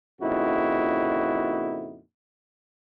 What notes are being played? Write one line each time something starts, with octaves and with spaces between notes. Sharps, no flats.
F2 A#2 C#3 D#4 E4 F#4